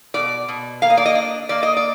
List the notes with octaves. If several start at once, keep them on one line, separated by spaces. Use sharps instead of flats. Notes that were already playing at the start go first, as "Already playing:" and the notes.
B2 D5
B2
A#3 F5
D#5
D5
D#5
D4
A#3 D5
D#5
D5